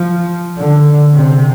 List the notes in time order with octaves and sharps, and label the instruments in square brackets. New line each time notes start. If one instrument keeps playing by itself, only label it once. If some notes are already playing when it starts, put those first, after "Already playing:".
Already playing: [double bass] F3
D3
C3